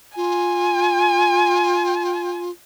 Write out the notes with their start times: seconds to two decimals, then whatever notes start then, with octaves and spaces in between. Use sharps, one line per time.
0.16 F4 G#5